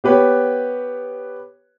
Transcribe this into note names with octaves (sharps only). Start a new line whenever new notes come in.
B3 G4 B4 C#5